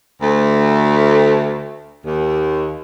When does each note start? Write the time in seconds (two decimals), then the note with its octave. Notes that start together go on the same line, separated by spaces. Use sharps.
0.21 D2 A3
2.05 D#2